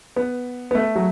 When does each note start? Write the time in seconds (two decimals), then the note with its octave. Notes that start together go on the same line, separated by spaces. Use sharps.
0.16 B3
0.71 B3
0.75 A3
0.96 F#3